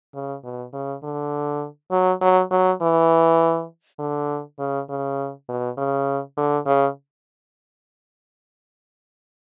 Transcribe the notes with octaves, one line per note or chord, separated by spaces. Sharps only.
C#3
B2
C#3
D3
F#3
F#3
F#3
E3
D3
C#3
C#3
B2
C#3
D3
C#3